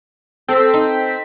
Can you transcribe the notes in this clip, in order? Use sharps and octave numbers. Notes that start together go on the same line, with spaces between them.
C4 A4 B6
D#4